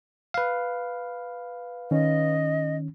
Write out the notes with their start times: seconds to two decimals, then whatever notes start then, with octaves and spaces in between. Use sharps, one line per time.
0.34 B4 F5
1.91 D#3 C#4 D#5